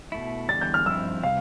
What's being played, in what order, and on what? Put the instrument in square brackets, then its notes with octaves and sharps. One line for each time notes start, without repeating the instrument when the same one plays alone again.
[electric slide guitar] B2 A3 E4
[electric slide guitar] E2 D3 G3 [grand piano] A6
[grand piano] G6
F6
[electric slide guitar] G2 F3 C4 E4 [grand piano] E6
[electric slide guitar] C3 G3 [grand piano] F5